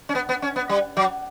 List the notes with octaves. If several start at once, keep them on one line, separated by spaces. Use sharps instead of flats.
C#4
B3
B3
C#4
B3
G3
F#3